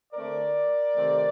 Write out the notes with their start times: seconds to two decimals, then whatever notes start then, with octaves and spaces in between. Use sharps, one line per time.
0.13 D3 A3 C4 A#4 D5
0.95 C3 D#3 A3 C4